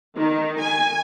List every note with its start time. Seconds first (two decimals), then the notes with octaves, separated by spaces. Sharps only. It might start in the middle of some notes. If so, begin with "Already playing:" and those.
0.16 D#3
0.61 G#5